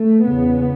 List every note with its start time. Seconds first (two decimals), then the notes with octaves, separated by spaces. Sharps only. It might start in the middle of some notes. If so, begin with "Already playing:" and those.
Already playing: A3
0.24 E2 C#3 B3